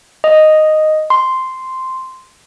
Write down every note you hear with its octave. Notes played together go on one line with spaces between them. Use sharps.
D#5
C6